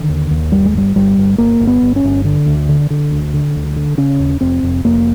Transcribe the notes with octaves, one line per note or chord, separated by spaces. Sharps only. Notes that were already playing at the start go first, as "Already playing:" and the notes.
Already playing: D3 D#3
D#2
D#2
G1 G3
G#3
G1 G3
G1 G3
G1
G1 A#3
G1
B3
G1
C#4
G1
D3
D2
D3
D3
D2
D3
D2
D3
C#3 C#4
D#2
F1 C4
F1
F1 A#3